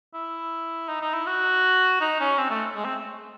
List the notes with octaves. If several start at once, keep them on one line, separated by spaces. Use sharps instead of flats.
E4
D#4
D#4
E4
F#4
D#4
C#4
C4
A3
G#3
C4